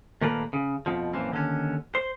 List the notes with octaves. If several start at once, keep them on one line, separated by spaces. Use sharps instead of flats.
D#2 A#2 A3 A#3 A#4 B4
C#3
F2 B2 F3
F#2 A#2 E3 F3 C4
D#2 D3 C#4
C5